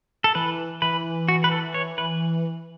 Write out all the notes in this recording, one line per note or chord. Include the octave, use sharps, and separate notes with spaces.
A4
E3 B4
E3 B4
F#4
B4
A4
C#5
B4